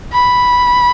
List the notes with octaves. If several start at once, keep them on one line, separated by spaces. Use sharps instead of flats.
B5